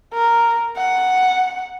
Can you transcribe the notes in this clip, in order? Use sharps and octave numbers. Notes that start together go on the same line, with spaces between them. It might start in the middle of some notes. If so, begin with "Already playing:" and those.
A#4
F#5